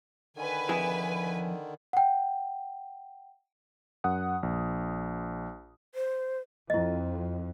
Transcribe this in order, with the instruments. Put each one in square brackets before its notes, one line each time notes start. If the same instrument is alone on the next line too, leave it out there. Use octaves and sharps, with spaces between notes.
[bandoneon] D3 D#3 [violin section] B4 G#5
[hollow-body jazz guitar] F2 E4 G#4
[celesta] F#5 G5
[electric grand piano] F#2 F#5 D#6
A#1
[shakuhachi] C5
[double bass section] F2 [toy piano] E4 D#5